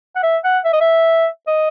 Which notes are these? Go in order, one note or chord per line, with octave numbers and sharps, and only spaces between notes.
F#5
E5
F#5
E5
D#5
E5
D#5